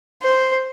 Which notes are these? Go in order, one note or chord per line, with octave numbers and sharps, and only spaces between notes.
C5